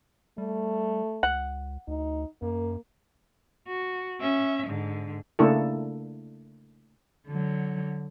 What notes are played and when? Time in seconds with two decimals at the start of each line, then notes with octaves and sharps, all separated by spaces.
0.38 G3 A3
1.23 C#2 F#5
1.88 D2 D#4
2.42 F#2 A#3
3.68 F#4
4.20 C#4 E5
4.67 G#2 D3
5.39 C#3 A3 A#3 D4 E4 A4
7.28 D3 F#3